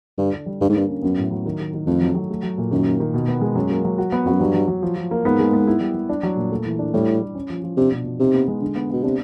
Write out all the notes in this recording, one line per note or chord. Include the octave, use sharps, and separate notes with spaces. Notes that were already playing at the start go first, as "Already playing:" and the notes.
G2 D3
D4
G3
G2 D3
G#2
G2 A#3
C#4
F#2 B3
A2
F#3
D#3
D#3
D#3
F2 A3
F#3
F#3
A3
F#3
A#2
F#2 D#3
A#3
D#3
B2
B3
G#3
F#2 F#3
A#3
F#3
F#4
B3
F2 F#4
F#2
G2 F#3
F#3
F#3
F3
F3
A#3
G#2 B3
G#3
B3
E4
G3
G3
D4
F#3
A#2
A3
E3
D4
A2 G3
D4
G3
C#4
F3
F3
C3 D4
B2
B2
C3 D#4
B3
G#3
D3
B3
B2 B3
C3 D4